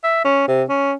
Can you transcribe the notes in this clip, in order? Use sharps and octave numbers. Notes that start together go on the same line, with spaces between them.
E5
C#4
C3
C#4